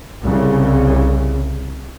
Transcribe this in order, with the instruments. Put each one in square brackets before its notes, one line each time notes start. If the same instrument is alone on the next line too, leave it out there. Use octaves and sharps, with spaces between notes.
[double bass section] C2 C#3